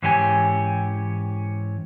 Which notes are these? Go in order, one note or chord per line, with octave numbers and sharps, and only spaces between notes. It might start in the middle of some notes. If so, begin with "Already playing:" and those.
G#2 E3 C#4 G4 A4 G#5